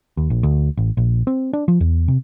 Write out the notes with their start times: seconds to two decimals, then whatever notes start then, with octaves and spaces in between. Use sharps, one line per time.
0.17 D#2
0.30 A#1
0.43 D2
0.77 A1
0.97 A#1
1.27 C4
1.53 D4
1.68 F3
1.81 E2
2.08 C3